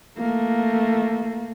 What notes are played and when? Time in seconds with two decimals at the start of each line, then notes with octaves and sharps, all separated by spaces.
0.17 A3 A#3